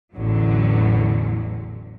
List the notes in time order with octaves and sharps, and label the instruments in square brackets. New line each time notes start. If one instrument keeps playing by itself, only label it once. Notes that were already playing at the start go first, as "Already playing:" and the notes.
[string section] A1 E2 D3 F#3